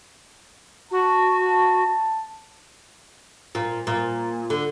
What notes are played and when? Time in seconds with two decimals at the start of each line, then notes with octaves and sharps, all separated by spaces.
0.92 F#4 A5
3.55 A#2
3.87 A#2
4.50 D3